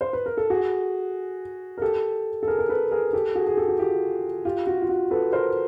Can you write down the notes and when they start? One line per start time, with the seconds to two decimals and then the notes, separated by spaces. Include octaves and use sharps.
0.01 C5
0.13 B4
0.26 A#4
0.37 A4
0.50 F#4 G#4
1.78 A#4
1.82 G4 A4
2.43 A4
2.48 G#4 A#4
2.59 A#4
2.69 A4 B4
2.91 G#4 A#4
3.13 G4 A4
3.35 F#4 G#4
3.47 G#4
3.57 G4 A4
3.68 F#4
3.79 F4 G4
4.45 F4 G4
4.67 F#4
4.82 F4
4.89 F#4
5.11 A4 B4
5.33 A#4 C5